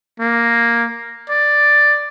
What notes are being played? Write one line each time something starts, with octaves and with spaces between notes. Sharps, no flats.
A#3
D5